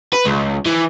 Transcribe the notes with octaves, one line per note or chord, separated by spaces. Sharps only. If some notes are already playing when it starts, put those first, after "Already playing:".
B4
C#2
E3